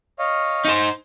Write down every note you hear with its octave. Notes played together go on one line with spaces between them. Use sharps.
C#5 D#5 F5
D#4 C5